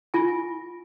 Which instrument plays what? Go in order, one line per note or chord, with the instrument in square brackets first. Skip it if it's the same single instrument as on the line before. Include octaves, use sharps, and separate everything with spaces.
[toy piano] F4 G#5